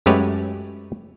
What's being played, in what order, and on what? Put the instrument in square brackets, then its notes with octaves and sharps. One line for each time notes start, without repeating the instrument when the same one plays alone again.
[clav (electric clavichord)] F#2 G#3 A3 G4 B4 C#5